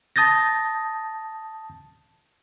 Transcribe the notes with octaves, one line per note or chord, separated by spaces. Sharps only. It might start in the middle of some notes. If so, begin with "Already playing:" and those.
A5 D#6 G6 A6 A#6